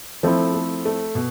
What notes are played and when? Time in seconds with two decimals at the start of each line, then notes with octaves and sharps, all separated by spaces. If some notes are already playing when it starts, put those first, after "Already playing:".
0.23 F3 A3 C4 E4
0.54 A3
0.85 A3
1.15 B2